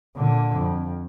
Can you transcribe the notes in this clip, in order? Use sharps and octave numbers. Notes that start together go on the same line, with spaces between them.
A#2 D3
F2